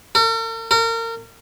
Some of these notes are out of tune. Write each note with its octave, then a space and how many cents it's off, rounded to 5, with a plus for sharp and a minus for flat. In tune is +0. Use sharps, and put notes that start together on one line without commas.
A#4 -45
A#4 -30